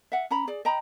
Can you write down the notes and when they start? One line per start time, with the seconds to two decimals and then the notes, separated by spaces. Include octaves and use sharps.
0.12 E5 F#5
0.31 C#4 A#5 B5
0.47 G#4 D5
0.65 D#5 G5 A#5 B5